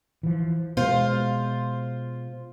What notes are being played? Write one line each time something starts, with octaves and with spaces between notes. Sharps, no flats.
E3 F3
B2 G#3 F4 C5